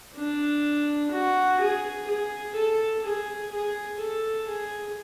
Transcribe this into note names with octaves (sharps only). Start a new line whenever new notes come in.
D4
F#4
G#4
G#4
A4
G#4
G#4
A4
G#4